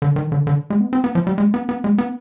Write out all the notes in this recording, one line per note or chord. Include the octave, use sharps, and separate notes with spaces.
D3
D#3
D3
D3
G#3
B3
C4
B3
F3
G3
G#3
B3
B3
G#3
B3